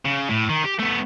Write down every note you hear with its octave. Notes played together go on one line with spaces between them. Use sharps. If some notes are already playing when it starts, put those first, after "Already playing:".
C#3
A2
D#3
G4
A3 B3